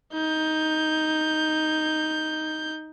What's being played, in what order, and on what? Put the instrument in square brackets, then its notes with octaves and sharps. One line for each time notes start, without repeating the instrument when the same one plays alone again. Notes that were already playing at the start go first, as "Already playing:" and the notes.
[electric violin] D#4 G6